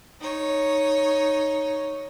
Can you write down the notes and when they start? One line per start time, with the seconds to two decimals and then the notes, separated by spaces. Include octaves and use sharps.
0.21 D#4 C#5